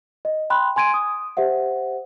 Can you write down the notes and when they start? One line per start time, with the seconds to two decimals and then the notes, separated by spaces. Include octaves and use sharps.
0.25 D#5
0.50 G5 B5 C6 F#6
0.76 G#5 C6 G#6 D7 D#7
0.94 D#6
1.37 G4 C5 E5 F#5